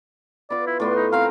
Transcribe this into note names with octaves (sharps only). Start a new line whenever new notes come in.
B3 F4 D5
E4
A2 B3 D5 C6
D#4
C4 A#4 F5